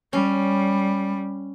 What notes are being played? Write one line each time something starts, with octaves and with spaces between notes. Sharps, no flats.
G3 C#4